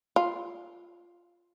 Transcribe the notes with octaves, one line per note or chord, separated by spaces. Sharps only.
F4